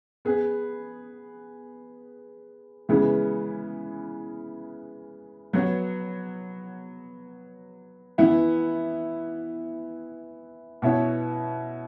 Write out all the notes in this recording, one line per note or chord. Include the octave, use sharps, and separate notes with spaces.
B3 G#4 B4
C#3 E3 G#3 B3 G#4
F#3 B3 F#4 C#5
E3 B3 E4
B2 B3 E4 C#5